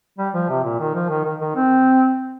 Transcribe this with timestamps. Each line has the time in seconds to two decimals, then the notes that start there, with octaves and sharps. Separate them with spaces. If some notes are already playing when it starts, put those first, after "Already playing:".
0.18 G3
0.34 F3
0.49 C3
0.64 A#2
0.80 D#3
0.95 F3
1.10 D#3
1.25 D#3
1.40 D#3
1.56 C4